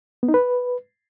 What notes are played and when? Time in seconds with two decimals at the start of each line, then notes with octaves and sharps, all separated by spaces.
0.23 B3
0.28 D#4
0.34 B4